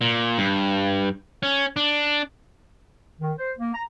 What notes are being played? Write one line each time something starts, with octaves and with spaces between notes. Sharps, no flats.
A#2
G2
C#4
D4
D#3
C5
A#3
A#5